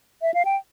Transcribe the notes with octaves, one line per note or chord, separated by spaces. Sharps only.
E5
F5
G5